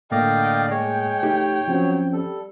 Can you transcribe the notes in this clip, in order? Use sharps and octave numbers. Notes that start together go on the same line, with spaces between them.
A2 D3 A3 A#3 D5 D#5 F5 G5
G#3 C#5 G5
A3 D#4 G4
F3 F#3 C4 C#4
G3 A4